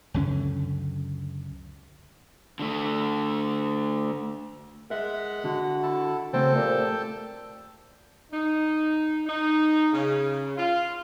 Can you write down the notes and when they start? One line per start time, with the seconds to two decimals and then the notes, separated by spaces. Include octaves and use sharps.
0.14 C#2 F#2 D3 C#4
2.59 D3 A3
4.90 G#3 A#4 E5 F#5
5.44 D3 F#4
5.83 E4 A4 A5
6.33 C#3 A3 C4 A4 G5 A5
6.55 A#2 A3 G4
8.32 D#4
9.27 D#4
9.92 C#3
10.57 F4